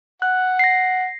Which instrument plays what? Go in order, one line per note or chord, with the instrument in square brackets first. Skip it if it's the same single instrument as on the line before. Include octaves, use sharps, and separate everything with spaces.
[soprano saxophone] F#5 [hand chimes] F#6
[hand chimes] A#6 C7